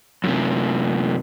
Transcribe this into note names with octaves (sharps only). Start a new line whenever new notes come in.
F#2 C3